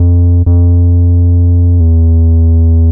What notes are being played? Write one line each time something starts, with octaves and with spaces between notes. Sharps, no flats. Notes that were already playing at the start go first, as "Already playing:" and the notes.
Already playing: F2
F2
E2